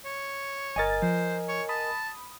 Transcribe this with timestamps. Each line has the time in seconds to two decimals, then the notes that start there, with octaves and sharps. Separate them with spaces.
0.05 C#5
0.76 G1 A#4 D#5 G#5 A6
1.02 F3 C5
1.48 C#5
1.69 A5 B5 D#6